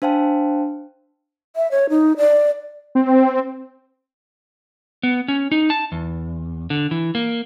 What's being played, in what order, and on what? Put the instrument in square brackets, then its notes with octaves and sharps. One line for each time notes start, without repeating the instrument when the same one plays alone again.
[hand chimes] D4 C5 F5 G5 A5
[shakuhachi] E5
C#5
D#4
D5
[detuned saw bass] C4
[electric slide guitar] B3
C#4
D#4
A5
E2
D3
E3
A#3